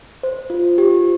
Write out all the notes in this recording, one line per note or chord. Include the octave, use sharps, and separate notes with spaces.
C5
F4
G4